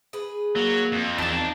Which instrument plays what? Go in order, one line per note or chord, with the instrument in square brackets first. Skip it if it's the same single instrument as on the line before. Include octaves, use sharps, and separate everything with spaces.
[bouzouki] G#4 B4
[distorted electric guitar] F#3 [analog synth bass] A#3
[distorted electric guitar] F2
[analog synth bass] E2 [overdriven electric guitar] D#4 A5 [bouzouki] A#4 D5